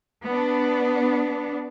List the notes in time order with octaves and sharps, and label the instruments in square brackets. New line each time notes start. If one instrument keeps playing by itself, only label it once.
[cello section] B3 D4